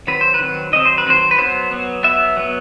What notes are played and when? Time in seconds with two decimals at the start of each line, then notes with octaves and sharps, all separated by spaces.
0.07 D#3 F#3 C4 B4
0.21 C5
0.34 B4
0.40 D#3 F#3 C4
0.72 D#3 F#3 C4 D#5
0.85 C5
0.98 B4
1.06 D#3 F#3 C4 C5
1.31 B4
1.38 F#3 B3 C5
1.71 F#3 B3
2.03 F#3 B3 E5
2.37 F#3 B3